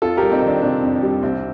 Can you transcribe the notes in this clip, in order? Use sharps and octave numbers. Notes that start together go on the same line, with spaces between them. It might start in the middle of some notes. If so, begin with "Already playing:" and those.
F2 F4 A4
G3 G4 A#4
C4 D#4
D#3 D4
C3 D4
F2
G3
C2 C4